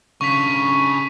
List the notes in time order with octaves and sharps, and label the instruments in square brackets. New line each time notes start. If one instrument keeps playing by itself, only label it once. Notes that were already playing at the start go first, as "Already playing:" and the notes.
[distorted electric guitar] C#3 D4 [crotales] C#6 B6